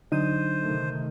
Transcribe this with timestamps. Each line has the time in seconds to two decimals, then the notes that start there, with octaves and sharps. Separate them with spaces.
0.12 D3 F#3 D4 D#4 C5 D#7
0.60 C3 D#3 A3